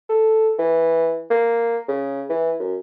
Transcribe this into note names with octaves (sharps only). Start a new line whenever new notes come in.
A4
E3
A#3
C#3
E3
F#2